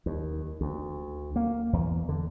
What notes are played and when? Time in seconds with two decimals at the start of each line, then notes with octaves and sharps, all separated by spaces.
0.06 D#2
0.61 D2
1.36 A#3
1.73 E2
2.09 D3